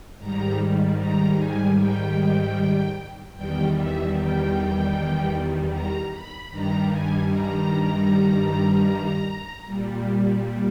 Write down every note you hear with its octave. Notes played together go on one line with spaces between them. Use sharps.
G#2 D#3 G3 A#5
A#5
G#5
G5
E2 D#3 G3 G5
E5
G5
A#5
B5
G2 D#3 G3 A#5
G#5
A#5
A#2 G3